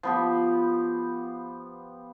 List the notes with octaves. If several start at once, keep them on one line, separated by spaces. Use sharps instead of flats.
F3 B3 G4